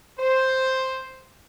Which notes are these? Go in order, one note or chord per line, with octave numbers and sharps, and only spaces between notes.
C5